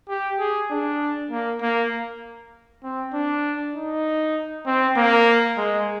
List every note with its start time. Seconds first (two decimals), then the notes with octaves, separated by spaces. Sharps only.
0.09 G4
0.39 G#4
0.71 D4
1.31 A#3
1.62 A#3
2.83 C4
3.14 D4
3.75 D#4
4.66 C4
4.97 A#3
5.57 G#3